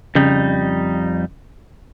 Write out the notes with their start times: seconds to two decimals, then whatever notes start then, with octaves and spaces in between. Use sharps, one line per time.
0.15 F2 C#3 G3 D#4